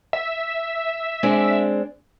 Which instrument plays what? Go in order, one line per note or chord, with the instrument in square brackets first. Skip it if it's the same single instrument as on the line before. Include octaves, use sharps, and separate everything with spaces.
[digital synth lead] E5
[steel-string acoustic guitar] G#3 C4 D4